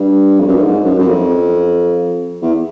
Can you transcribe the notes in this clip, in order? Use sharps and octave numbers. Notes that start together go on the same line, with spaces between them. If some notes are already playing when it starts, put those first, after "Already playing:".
Already playing: G2
F2
F#2
G2
G#2
F#2
F#2
F2
E2